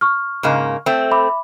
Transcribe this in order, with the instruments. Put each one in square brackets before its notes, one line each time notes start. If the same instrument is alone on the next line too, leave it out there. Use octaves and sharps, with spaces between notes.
[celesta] C#6 F6
[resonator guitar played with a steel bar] G#2 C#3 A#3
A3 C4
[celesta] E5 B5 D6